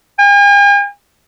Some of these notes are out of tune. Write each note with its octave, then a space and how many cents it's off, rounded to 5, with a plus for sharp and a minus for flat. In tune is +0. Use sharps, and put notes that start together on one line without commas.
G#5 -45